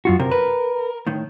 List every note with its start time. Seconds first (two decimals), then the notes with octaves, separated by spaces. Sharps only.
0.05 F#2 F4 F#4
0.20 C3 A#4
0.32 B4
1.07 A2 D#3